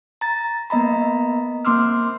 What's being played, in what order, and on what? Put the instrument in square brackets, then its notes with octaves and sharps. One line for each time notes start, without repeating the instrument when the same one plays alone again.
[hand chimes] A#5 A6
A#3 B3 D#5 A#5 B5
A#3 C4 C6 D6 E6 F6